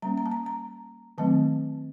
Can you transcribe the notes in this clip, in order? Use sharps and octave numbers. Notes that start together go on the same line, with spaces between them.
G3 A#3 C#4 A#5
A#5
A5
A#5
A#5
D#3 F#3 A3 C4 A5